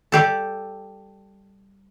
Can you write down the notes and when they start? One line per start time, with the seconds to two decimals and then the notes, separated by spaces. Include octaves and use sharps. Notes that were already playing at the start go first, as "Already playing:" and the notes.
0.12 G3 G4 A4